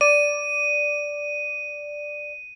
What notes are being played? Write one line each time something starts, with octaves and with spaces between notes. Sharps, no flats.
D5 D#7